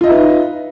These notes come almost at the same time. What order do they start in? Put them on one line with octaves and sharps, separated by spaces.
F4 D#5 E5 B4 D#4